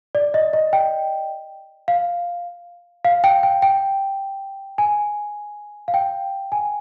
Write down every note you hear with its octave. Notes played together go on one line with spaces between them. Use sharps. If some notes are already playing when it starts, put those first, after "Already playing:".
D5
D#5
D#5
G5
F5
F5
G5
G5
G5
G#5
F5
G5
G#5